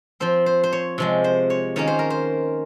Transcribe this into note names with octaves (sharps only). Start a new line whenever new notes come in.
F3 C4 C5
C5
C5
C#5
C3 F3 G#3
C5
C#5
D#3 A#3 C#4 C#5
C5
A#4
C5